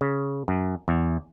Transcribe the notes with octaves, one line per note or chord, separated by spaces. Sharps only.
C#3
F#2
E2